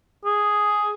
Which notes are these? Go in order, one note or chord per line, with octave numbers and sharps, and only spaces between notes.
G#4